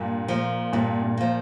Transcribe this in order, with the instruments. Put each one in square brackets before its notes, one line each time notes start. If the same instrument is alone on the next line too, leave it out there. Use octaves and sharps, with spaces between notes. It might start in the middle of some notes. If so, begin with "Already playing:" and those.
Already playing: [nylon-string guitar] G2 [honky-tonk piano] A#2
[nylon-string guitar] F3 A#3
[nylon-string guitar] G2 [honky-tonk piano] A#2
[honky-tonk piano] A#2
[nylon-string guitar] F3 A#3